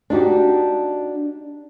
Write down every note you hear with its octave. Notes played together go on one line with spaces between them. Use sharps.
D4 D#4 F#4 G4